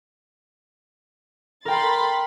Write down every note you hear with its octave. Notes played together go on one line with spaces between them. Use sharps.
A#4 G5 B5 C6 A6